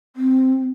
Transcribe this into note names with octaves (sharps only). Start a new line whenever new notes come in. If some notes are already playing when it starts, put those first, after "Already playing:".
C4